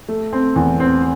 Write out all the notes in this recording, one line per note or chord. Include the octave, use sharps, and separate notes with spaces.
A3
C4
E2
C4